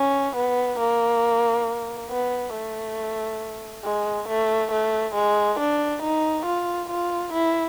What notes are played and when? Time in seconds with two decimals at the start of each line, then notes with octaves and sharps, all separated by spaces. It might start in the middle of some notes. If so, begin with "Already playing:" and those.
Already playing: C#4
0.36 B3
0.80 A#3
2.10 B3
2.54 A3
3.84 G#3
4.29 A3
4.72 A3
5.15 G#3
5.60 D4
6.03 D#4
6.46 F4
6.90 F4
7.33 E4